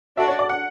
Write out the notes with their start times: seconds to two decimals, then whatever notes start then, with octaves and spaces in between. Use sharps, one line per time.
0.17 D4 F#4 A4 D5 E5
0.28 C#5
0.39 D5
0.49 F#5